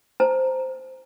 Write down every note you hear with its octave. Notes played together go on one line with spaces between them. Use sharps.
C5 A5 A#5